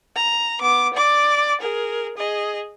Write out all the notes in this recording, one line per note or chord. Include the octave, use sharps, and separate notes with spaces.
A#5
B3 D6
D5 D6
G#4 A#4
G#4 D#5